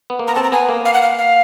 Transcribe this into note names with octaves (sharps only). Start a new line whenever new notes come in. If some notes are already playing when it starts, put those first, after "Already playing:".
B3
A#3
B3 A#5
C4 A5
A#5
B3 G#5
A#3
F5
F#5
F5
F5